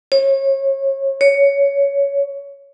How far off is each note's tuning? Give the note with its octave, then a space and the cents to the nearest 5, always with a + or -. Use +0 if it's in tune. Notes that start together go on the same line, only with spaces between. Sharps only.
C#5 -30
C#5 +15